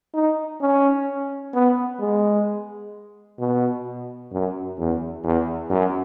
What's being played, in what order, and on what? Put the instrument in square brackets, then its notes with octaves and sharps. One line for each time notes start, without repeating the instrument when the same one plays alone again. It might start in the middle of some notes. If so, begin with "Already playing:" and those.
[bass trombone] D#4
C#4
B3
G#3
B2
F#2
E2
E2
F#2